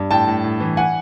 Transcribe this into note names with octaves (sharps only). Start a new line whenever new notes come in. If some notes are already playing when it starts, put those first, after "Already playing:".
Already playing: G2
A2 G5 A5
A2
A2
E3
F#5 G#5